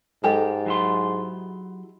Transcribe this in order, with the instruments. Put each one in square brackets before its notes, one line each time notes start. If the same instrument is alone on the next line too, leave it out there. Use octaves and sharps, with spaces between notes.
[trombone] G#2 [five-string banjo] G#3 G4 A4
[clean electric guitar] F#3 E4 C6